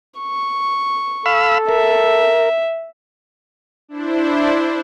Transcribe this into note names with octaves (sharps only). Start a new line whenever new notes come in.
C#6
A4 F5 B5 E6
A#4 E5
D4 E4 C5